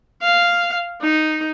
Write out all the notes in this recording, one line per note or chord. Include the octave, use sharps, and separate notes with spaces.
F5
D#4